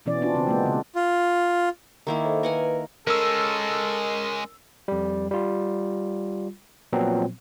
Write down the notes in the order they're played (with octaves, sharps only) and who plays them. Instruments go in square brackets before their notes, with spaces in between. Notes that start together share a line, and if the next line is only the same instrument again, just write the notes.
[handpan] B2 E3 B3 C#4 D5
C4 D4 F4
C#3 C4
G#3 A#3 B3
C#3
[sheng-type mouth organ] F4
[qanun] D#3 A#3 E4 [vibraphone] A#5
[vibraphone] A4 C5 D#5
[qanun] A#4 F#5 G#5 [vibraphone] B4
[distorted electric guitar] G#3 C#4 [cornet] A4 [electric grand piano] A#4 E6
[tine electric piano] F2 G3
G3 F4
A#2 F3 F#3 B3 C4